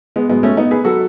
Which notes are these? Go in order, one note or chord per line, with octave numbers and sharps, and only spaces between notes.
G#3 B3
G#2 F#3 G#3 B3
A3 C#4
B3 D#4
G#4 B4
F#3 F#4 A4